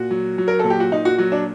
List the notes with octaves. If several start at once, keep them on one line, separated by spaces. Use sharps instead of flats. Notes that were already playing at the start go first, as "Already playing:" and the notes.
Already playing: A#2 F#4
F#3
F#3
A#4
A#2 A4
G4
F#4
A#2 D#4
F#4
F#3 F#4
D4